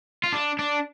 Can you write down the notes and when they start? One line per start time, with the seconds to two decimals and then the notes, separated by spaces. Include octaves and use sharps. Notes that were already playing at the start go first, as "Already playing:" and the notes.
0.24 F4
0.32 D4
0.59 D4